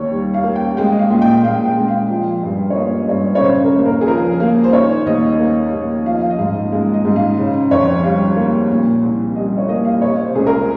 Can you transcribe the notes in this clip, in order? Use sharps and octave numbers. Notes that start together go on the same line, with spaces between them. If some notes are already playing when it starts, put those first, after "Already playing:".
Already playing: D#2 D#3 C#5
G3
F5
A#3
G5
G#3 G5
D#5
F5
A#2
G5
A#2 F5
G5
G#3
F5
F3
G2
C#5
A#3 D#5
G2 C#5
C#5
C#3 C5
A#4
D#2
A#4
G#4
F3 A#4
A#3
C5
D#3 C#5
D#2 D#5
A#3
D#2
F3 F5
D#5
F5
D#5
G#2 F5
G#3 F5
D#5
G#2
F5
C#3
F2 C#5
G3 F5
A#3
A#2
C2
G3 D#5
C#5
A#3 D#5
F5
D#5
C3 C#5
C5
C#2 G#4
A#4